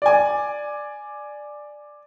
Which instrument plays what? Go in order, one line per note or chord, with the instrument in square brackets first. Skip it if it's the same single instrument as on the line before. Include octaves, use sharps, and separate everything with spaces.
[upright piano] D5 G#5